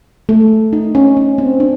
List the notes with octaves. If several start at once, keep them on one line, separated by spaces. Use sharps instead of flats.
A3
D#4
C#4
C#4
C4
D4